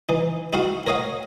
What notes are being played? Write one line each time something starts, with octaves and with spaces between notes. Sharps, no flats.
E3 D#4
D#4 E4 F#4 F5 F#5
A#4 C#5 D#5 F5 F#5